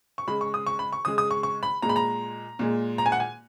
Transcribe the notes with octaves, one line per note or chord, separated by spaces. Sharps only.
C#6
C#3 G#3 B5
C#6
D#6
C#6
B5
C#6
C#3 G#3 D#6
D#6
C#6
C#6
B5
A#2 G#3 A#5
B5
A#5
A#2 G#3
A#5
G#5
F#5
G#5